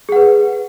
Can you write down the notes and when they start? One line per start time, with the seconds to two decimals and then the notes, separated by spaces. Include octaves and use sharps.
0.09 G#4
0.12 F#5
0.16 B4